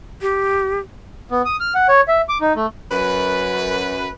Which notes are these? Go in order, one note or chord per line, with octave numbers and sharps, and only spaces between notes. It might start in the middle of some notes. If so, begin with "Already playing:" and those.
G4
B3
D#6
F6
F#5
C#5
E5
D6
D#4
A3
F#2 B4